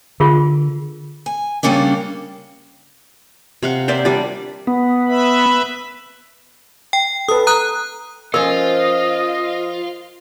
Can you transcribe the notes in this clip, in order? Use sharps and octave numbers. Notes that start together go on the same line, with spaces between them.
D3 F4 G#4 A#4
G#5
C#3 G3 A#3 C#4 D4
C3 F5 F#5
A#4 C5 D5 E5
G3 D4 D5
B3
B4 E5 B5
G5
A4 B4 D#6
A#5 D#6 F#6
F3 C#4 F4 A#4 D#5